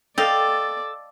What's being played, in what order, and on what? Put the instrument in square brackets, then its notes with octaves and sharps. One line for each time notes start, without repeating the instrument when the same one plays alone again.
[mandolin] A4 [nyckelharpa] D5 [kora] D#5 F5 G5